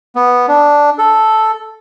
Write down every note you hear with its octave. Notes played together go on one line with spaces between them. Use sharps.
B3
D4
A4